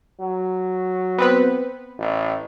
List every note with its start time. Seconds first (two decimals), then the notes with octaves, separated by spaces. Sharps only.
0.21 F#3
1.18 B3 C4 B4
1.99 A1